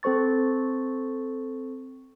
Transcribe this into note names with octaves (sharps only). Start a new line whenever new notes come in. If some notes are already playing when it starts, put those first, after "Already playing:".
C4 A4 C5 C#6 A6